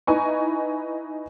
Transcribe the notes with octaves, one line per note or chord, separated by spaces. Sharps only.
D#4 E4 B4 G#5 C#6